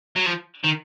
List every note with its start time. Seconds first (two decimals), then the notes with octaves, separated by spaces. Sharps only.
0.16 F#3
0.26 F3
0.64 D#3